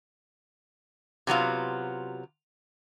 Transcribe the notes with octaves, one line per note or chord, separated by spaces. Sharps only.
C3 F#3 B3 F4